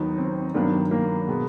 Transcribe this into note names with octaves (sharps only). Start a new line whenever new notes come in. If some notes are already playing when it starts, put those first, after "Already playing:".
Already playing: D#2 D#3 F#3 B3 D#4
C4
G2 D#3 F#3 A#3 B3 D4
A#3
B2 G#3 B3